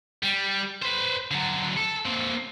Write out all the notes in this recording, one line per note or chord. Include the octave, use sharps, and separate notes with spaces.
G3
B4 C5
D3 F#3
A4
A#3 C4